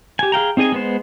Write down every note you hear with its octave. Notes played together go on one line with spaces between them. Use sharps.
G4 G#5
G#4 F5 G5 A#5
C4 D#4 G#4 D#5 G#5
G#3 B3 C5